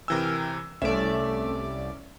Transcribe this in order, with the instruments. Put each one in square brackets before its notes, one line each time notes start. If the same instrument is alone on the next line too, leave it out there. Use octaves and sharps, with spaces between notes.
[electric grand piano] C3 E3 E6 [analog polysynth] A#4 G5 G#5
[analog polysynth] C2 D5 [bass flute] A3 [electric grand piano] C#4 E5 E7